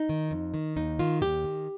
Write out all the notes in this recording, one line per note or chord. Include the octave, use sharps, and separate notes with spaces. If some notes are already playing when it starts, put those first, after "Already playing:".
Already playing: D#4
D#3
F2
D#3
D#2 D#4
D#3 F4
D#2 G4
D#3